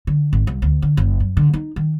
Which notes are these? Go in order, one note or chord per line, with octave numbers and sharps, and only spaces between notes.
D3
G#1
C2
D2
D3
F#1
F#2
D3
D#4
D#3